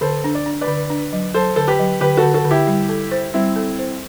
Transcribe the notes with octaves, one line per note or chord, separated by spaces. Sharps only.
D3 A4 C5
D4
D5
D4
B4 D5
D3
D4
F#3
F#3 A4 C5
D3 A4
G4 B4
F#3
D3 G4 B4
F#4 A4
D3
F#4 A4
D3
E4 G4
G3
A4
C5
G3 C4 E4
A4
C5